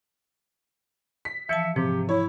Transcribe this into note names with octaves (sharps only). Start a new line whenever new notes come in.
B6
E3 F3 E5 A5 C#7
G#2 C3 F3 G4
E4 C#5